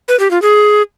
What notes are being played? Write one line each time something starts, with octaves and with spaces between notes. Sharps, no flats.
B4
G4
F4
G#4